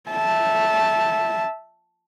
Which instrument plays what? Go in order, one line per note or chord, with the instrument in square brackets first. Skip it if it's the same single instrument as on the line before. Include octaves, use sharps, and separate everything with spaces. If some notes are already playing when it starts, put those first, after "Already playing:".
[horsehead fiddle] E5 A5